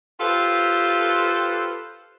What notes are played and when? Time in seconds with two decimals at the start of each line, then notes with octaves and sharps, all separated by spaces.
0.20 F4 G4 A4 B4 C5 F5